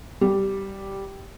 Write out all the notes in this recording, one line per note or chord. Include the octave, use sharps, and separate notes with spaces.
G3